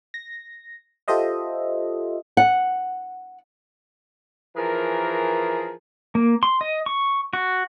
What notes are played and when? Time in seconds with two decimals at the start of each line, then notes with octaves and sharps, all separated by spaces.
0.14 A#6
1.08 F4 G4 A4 C5 D#5 E5
2.37 F#5
4.55 E3 F3 G#4 A#4
6.15 A#3
6.43 C6
6.61 D#5
6.86 C#6
7.33 F#4